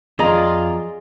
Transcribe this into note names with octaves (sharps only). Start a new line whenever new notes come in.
F2 F4 G#4 D5 D#5 A#5